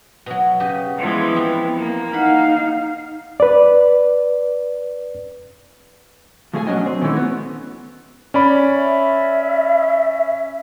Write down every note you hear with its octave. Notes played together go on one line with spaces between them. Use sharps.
B2 F#3
C#3 G4 D#5
E3 F3 G#3 B3
C4
A#3
D#4 F5 F#5 B5
B4 D5
F3 A3 G#4 D#5 G#5
B1 F#3 C#4 D4 D#5 G#5
C4
D#3 E3 G#3 A3 C#4 F#4
B3
C#4 D5 B5
E5